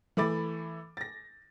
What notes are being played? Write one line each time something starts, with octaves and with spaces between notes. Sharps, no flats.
E3 A3 B5 D6 A6
A6 A#6